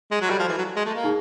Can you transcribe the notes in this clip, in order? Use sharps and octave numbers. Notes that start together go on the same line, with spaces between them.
G#3
F#3
G3 F#4 A4 D5
F3
E3
F#3
G#3
A3
A#3
D#4 G#4